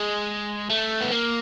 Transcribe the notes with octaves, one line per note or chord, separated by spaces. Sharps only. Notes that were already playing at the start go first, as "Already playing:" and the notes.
Already playing: G#3
A3
B3
A#3